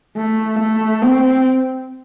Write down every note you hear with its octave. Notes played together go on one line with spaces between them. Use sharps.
A3
A3
C4